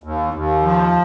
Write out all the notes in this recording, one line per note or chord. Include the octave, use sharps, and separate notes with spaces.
D#2
D#2
F3